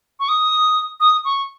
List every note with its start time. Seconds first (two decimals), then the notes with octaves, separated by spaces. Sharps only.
0.19 C#6
0.29 D#6
1.00 D#6
1.25 C#6